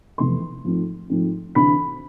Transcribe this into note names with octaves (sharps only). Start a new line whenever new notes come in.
F1 E2 C3 E3 A3 C6
G#2 F3 A3 C4
G#2 F3 A3 C4
D2 C3 E3 B5